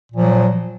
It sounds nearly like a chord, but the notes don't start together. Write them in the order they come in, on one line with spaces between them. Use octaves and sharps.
A#2 F3 F#3